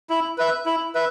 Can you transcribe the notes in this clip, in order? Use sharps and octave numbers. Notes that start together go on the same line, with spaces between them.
E4
B4 E5
E4
B4 E5